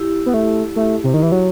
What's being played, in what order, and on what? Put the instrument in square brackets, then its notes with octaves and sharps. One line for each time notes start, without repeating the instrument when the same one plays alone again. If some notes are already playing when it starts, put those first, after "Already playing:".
Already playing: [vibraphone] E4 G4
[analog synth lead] B3
A3
A3
C3
D#3
E3
F#3